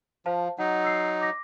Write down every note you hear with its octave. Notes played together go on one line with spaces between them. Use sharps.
F3 C5 F5 A5
F#3 D#4 F#5
E6 C7
D6 A#6